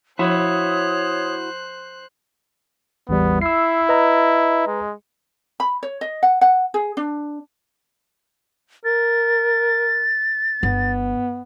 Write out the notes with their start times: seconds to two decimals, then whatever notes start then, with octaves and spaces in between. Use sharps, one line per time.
0.19 F3 E4 F#4 C5 C#5 D#6 F#6
3.09 A1 E2 G3 B3
3.41 E4 E6 C7
3.89 B4 D#5 A#5
4.67 G#3
5.60 B5
5.83 C#5
6.01 D#5
6.23 F#5
6.41 F#5
6.74 G#4
6.97 D4
8.85 A#4 A6
10.63 G1 B3